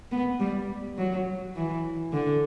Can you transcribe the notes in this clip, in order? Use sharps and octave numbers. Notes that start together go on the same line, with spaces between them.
B3
G3
F#3
E3
D3